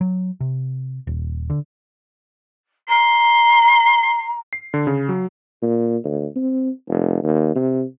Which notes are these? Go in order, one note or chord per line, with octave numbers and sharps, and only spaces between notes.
F#3
C3
D#1
D3
A#5 C6
C7
D3
C#3
F#3
A#2
D2
C4
F1
D#2
C3